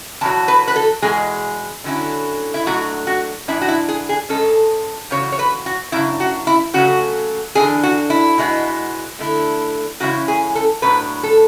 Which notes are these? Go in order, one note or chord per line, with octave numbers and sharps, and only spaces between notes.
E2 B2 F#3 A5
B4
B4
A4
E2 B2 G#3 G#4
D3 F#3 C#4 E4
E4
B2 F#3 A3 D4 F#4
F#4
G#2 E3 B3 D4 E4
F#4
E4
G#4
G#4
G#2 G#3 C#4 A4
E2 C#3 F#3 C#5
C#5
B4
F#4
F#2 C#3 D4 E4
F#4
E4
C#3 F#3 A3 F#4
E2 D3 G#3 D4 G#4
F#4
E4
B2 G#3 B3 E4
D3 A3 E4
E2 C#3 G#3 C#4 E4 F#4
G#4
A4
A2 F#3 B3 D4 B4
A4